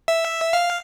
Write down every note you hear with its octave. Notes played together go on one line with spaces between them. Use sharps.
E5
F5